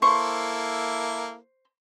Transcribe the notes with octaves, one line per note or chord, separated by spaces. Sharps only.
A#3 E4 A4 C5 C#6